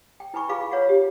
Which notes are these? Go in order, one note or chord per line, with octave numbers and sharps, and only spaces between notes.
G5
E4 B4 G#5 B5 C#6
F4 G#4 B4 F5 B5 D6
B4 C#5 F5 F#5
G4